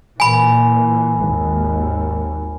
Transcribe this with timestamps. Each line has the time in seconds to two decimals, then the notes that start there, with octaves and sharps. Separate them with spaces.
0.20 A#2 E3 G#5 B5
1.20 G#1 D#2